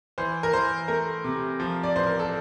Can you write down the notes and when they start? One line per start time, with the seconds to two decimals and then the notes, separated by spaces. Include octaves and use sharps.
0.18 E3 C5
0.43 A#4
0.53 E3 C5
0.88 A3 A#4
1.24 C3
1.60 F3
1.83 D5
1.95 A1 C5
2.07 A#4
2.19 A4